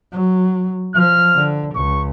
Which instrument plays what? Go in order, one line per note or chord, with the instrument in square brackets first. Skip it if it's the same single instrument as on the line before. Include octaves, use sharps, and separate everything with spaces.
[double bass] F#3
[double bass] F3 [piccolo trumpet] F6
[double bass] D3
[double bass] C#2 [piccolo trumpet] C#6